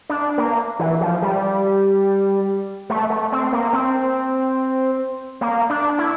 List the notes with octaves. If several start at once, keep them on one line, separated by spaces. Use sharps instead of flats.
D4
A#3
E3
F3
G3
A3
A3
C4
A#3
C4
A#3
D4
E4